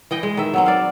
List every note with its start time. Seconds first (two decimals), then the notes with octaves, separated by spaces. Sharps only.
0.11 E3 D#5 G5
0.23 G#3
0.37 D#3 E5
0.54 F#3 B3 C4
0.66 D5 F5